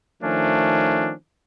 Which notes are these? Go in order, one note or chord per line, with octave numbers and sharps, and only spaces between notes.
D#3 F3 A3 C#4 D4